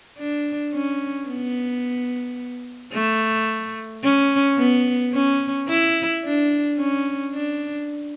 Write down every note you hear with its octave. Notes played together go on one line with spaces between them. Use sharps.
D4
C#4
B3
A3
C#4
B3
C#4
E4
D4
C#4
D4